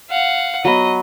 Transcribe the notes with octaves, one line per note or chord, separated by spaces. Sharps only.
F5 F#5
F#3 B3 D#5